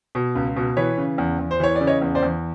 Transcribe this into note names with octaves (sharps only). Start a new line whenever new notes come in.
B2
C#2
B2
E3 B4 C#5
C#3
E2
E2
C5
E3 C#5
D5
C#3
C#5 D#5
E2
C5 D5
E2